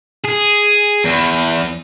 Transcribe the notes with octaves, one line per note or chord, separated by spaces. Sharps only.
G#4
E2